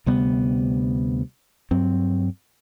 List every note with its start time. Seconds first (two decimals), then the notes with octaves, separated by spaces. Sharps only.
0.06 D2 C3 G3 B3
1.71 G2 F#3 C4